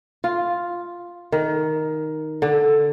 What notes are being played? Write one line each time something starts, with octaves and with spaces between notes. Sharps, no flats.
F4
D#3
D3